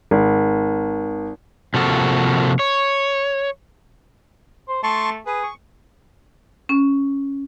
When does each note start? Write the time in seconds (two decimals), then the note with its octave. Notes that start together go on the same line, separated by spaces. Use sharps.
0.11 G#1
1.74 C3 F3 A#3 F#4 A4
2.59 C#5
4.68 C5
4.83 A3 A5 C6 C#6
5.26 G#4 B4
5.43 C#6
6.69 C#4